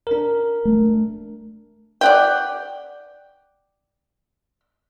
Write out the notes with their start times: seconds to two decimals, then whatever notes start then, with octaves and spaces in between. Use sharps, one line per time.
0.07 D4 A#4
0.65 A3
2.01 D5 F#5 G5